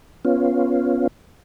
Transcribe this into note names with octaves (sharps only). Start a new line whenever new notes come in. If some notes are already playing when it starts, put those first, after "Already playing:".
B3 C#4 F4